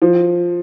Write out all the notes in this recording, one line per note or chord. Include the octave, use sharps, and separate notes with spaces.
F3